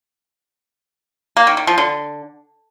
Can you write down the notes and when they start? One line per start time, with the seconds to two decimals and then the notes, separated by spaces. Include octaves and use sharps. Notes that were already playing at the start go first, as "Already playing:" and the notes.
1.37 A#3
1.47 D#3
1.57 D#3
1.67 F3
1.78 D3